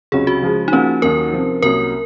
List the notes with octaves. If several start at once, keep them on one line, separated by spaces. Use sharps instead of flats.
C#2 C3 F#3 C#4 G#4
F#4
C#3 F3 G#3
D#4
F3 A#3 C#4 F4 C5
D#2 D#3 F#3 A#4
C3 F3 C4
C2 C3 F#3 A#3 C#4 A#4